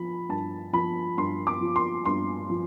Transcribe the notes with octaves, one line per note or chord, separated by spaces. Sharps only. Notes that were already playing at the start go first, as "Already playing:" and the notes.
Already playing: F3 B5
G2 A5
F3 B5
G2 C6
D6
F3
C6
G2 C6
F3